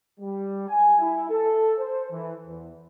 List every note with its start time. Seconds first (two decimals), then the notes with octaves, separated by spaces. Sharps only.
0.20 G3
0.68 G#5
0.99 E4
1.30 A4
1.78 C5
2.10 E3
2.45 E2